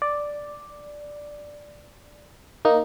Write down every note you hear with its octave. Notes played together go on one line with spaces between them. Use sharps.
D5
A#3 D#4